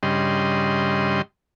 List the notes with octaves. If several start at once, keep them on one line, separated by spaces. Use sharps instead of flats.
G2 C#3 G3 D#5 C6